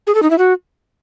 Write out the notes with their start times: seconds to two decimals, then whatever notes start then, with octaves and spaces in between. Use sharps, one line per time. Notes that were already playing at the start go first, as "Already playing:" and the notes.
0.07 G#4
0.15 A4
0.23 D#4
0.30 E4
0.38 F#4